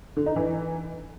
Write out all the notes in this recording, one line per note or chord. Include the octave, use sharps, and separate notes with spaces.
D3
D#4
E3